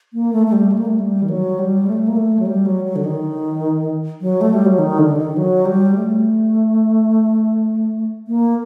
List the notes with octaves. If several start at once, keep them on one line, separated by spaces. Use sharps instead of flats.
A#3
A3
A3
G3
A3
A#3
A3
G3
D#3
F#3
G3
A3
A#3
A3
F#3
G3
F#3
F#3
D3
D#3
F#3
A3
G3
F#3
D#3
D3
D#3
F#3
G3
A3
A#3